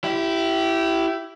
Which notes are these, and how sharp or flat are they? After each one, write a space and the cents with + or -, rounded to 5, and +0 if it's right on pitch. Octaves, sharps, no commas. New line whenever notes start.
E4 +10 G4 -20